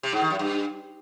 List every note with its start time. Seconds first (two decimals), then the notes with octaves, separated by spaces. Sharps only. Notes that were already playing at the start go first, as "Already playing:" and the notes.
0.03 C3
0.12 G#2
0.21 D#3
0.30 F#2
0.39 G2